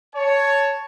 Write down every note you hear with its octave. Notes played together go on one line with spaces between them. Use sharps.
C#5 A5